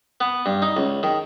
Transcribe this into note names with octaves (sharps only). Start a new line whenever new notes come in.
B3
G2
D#4
C#2
D#3